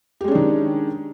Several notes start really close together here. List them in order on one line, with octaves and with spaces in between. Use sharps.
G4 G#3 C#4 D4 D#3